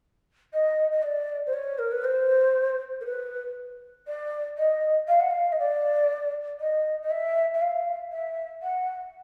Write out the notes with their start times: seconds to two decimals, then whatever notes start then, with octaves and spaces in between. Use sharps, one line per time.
0.53 D#5
0.91 D#5
1.02 D5
1.46 C5
1.53 C#5
1.78 A#4
1.91 B4
2.04 C5
3.00 A#4
3.05 B4
4.07 D5
4.57 D#5
5.08 F5
5.20 F#5
5.30 F5
5.52 D#5
5.58 D5
6.60 D#5
7.02 D#5
7.10 E5
7.54 E5
7.61 F5
8.12 E5
8.62 F#5